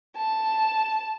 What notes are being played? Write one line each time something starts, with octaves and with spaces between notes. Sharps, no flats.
A5